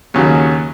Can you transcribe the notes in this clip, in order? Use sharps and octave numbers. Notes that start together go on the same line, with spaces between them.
D#2 C#3 F#3